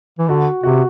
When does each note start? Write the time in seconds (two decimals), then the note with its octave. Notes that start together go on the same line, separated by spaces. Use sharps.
0.19 E3
0.28 D3 F#4
0.63 C3 F#4